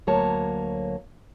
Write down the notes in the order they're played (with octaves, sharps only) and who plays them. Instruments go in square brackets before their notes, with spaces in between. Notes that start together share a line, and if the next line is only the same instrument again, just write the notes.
[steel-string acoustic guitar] D2 F#3 A#3 C#5 A5